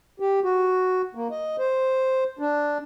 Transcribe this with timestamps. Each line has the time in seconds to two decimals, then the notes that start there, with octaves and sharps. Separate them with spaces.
0.20 G4
0.44 F#4
1.15 A#3
1.31 D#5
1.58 C5
2.39 D4